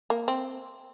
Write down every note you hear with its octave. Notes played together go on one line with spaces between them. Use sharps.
A#3
C4